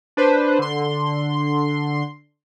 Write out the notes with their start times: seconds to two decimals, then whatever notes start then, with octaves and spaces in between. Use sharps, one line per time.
0.17 D4 B4 C5
0.59 D3 C6